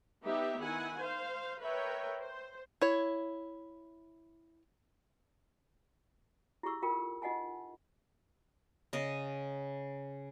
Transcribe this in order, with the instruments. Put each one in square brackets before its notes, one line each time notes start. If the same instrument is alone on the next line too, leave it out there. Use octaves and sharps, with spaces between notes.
[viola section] G3 B3 D#4 G4 E5
D#3 E4 F#5 G#5
C5 F5
A#4 B4 C#5 E5 G5
C5
[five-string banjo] E4 C#5
[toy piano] E4 G4 G#4 C#6 E6
F4 A4 A#4 G5
D#4 F4 D#5 F#5 G#5 A5
[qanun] C#3 D#5